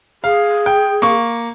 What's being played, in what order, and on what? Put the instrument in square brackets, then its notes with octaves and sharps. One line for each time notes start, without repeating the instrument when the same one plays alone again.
[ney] G#4 [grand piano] F5
[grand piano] G5
A#3 C#6